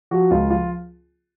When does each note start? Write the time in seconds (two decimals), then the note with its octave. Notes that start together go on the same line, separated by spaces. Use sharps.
0.11 F3 F#4
0.31 C#2 F4
0.50 F3 F4